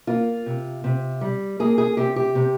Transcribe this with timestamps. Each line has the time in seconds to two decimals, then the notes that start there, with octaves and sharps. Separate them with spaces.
0.07 A#3 F4
0.46 C3
0.84 C3
1.21 G3
1.60 A#3 G#4
1.78 G#4
1.97 C3 G4
2.16 G4
2.35 C3